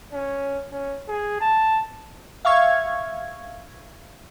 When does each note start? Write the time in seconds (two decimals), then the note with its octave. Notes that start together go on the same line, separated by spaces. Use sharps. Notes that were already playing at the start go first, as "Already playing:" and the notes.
0.13 C#4
0.72 C#4
1.08 G#4
1.40 A5
2.45 E5 F5 C#6 G#6